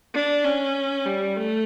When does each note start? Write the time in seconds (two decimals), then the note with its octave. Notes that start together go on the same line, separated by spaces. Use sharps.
0.14 D4
0.44 C#4
1.05 G3
1.35 A3